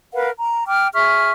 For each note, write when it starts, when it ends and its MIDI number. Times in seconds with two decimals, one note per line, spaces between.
0.14 0.30 70
0.14 0.30 71
0.14 0.30 77
0.14 0.30 78
0.37 0.63 82
0.67 0.87 79
0.67 0.87 86
0.67 0.87 89
0.93 1.32 68
0.93 1.32 76
0.93 1.32 85
0.93 1.32 89